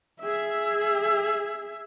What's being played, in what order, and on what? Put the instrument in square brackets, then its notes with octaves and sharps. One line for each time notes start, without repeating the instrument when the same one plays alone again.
[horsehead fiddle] G#4 E5